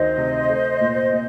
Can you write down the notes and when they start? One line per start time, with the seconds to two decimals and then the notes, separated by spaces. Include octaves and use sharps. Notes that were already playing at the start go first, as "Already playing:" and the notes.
Already playing: D2 D#3 C5 D#5
0.17 C3
0.48 A3
0.80 A#2
1.12 A#2